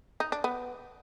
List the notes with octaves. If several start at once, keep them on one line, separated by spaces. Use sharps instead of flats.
D#4
D4
B3